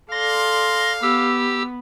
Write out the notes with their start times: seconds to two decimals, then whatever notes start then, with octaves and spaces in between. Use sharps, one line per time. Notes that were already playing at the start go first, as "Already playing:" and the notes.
0.12 A4 D5 F5 C6 A#6
1.02 B3 G4 E6